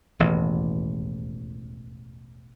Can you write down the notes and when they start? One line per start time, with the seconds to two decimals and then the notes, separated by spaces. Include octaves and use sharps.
0.19 E1 A1 D#2 E3